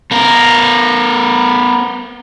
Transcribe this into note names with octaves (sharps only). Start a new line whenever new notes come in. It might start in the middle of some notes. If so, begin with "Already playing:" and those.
B3 A#4